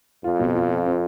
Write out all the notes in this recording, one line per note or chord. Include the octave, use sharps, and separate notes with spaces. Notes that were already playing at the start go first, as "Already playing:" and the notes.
F2 F4
B2
F4
F4
C4